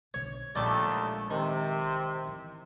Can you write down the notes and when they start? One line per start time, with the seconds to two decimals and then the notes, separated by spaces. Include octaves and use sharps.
0.14 B1 D3 C#5
0.56 A#1 D#2 G#3 A3 D5 G5 A5
1.31 C3 D#3
2.27 E3